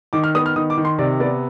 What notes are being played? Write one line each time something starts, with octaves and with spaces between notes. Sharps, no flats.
D#3 D6
F6
B3 D#6
F6
D#3 D#6
D6
D#3
C6
C3 D5
B3 D5